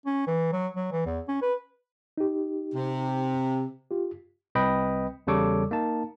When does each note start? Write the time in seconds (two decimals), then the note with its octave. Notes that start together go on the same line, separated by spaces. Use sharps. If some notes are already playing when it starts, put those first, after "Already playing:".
0.06 C#4
0.27 E3
0.53 F#3
0.76 F#3
0.92 E3
1.06 E2
1.28 C#4
1.42 B4
2.18 D#4 G4
2.74 C3
3.91 F4 G4
4.55 C2 C4 B4 D#5 G5 B5
5.27 E2 C#3 G3 A4 C#5 D6
5.71 A#3 D#4 A5